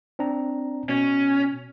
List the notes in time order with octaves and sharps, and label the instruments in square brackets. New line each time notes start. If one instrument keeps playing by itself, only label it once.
[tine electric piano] C4 D4 A#5
[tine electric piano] B2 [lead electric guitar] C#4